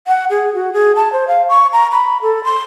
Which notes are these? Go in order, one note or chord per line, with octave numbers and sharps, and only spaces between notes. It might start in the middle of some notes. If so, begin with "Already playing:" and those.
F#5
G#4
F#4
G#4
A5
C5
F5
C#6
A#5
B5
A4
C6